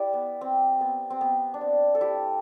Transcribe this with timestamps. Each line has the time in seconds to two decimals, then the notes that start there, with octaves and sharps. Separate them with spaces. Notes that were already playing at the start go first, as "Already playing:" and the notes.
Already playing: E4 G4 D5 G5
0.13 B3
0.41 C4
0.81 B3
1.10 C4
1.21 B3
1.54 D4
1.61 C4
1.95 A4
2.01 E4 G4